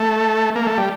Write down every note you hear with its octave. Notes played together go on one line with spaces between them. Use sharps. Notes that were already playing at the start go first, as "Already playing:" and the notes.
Already playing: A3
A#3
A3
G3